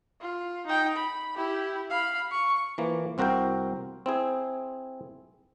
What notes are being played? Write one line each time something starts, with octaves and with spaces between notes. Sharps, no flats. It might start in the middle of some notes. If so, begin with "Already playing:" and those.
F4
D#4 G5
B5
E4 G4
F5 B5
C#6
E3 F3 A#3
C2 C4 F#4 A#4 F5 G5
C4 E4 G#4